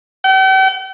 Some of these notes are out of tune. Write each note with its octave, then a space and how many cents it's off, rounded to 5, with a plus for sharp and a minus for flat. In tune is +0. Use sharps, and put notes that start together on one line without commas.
G5 -45